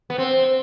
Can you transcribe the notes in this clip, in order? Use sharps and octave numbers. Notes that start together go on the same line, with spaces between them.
B3
C4